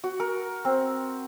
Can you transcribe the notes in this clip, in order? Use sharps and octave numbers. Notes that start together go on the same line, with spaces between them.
F#4
A#4
C4